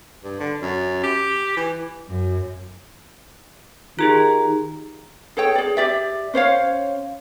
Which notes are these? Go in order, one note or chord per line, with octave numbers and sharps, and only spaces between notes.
G2
D3
F#2
G4
E3
F#2
D#3 F4 G4 G#4 A#5
G#4 A4 C#5 G5
G#4 D5
G4 D5 E5
C#4 C5 C#5 F5